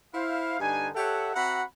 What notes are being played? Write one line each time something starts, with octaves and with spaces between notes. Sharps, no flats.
E4 C5 F5
G2 D3 D4 D#4 G#5
G4 A4 C#5 E5 F#5
C4 F#4 E5 F#5 A#5 B5